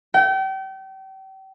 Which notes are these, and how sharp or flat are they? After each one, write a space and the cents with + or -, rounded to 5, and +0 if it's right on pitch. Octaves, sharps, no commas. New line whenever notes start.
G5 -35